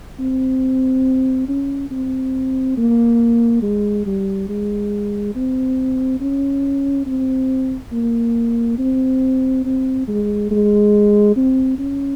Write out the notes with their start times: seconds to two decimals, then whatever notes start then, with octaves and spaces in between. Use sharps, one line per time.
0.19 C4
1.48 C#4
1.90 C4
2.77 A#3
3.62 G#3
4.06 G3
4.49 G#3
5.35 C4
6.20 C#4
7.06 C4
7.92 A#3
8.78 C4
9.64 C4
10.08 G#3
10.51 G#3
11.36 C4
11.79 C#4